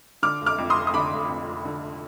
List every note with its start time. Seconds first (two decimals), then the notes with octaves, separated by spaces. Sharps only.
0.23 D3 D6 F6
0.41 F1
0.46 D6 F6
0.58 F2
0.70 C6 D#6
0.76 F1
0.87 D#6
0.94 D3 B5 D6
1.12 F1
1.29 F2
1.47 F1
1.65 D3